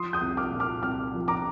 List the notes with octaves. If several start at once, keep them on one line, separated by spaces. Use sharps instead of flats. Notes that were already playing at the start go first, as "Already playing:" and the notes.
Already playing: F3 C6 D#6
D#6 G6
C2
D6 F6
A#2
D6 F6
C2 D6 F6
F3
A#5 D6